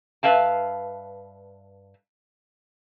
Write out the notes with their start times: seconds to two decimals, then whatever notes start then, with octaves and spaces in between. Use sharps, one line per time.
0.23 G2 B4 E5 F5 A5